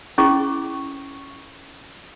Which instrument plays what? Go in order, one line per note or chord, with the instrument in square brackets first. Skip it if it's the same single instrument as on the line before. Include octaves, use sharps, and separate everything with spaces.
[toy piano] C#4 E4 G#4 C#6